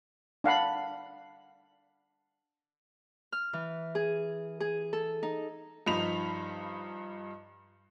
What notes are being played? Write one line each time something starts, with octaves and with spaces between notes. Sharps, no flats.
D4 F5 F#5 B5
F6
E3
G#4
G#4
A4
D#4
G2 F3 D#4 B5 F7